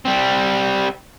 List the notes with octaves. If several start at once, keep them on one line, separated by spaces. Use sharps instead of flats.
G3 C4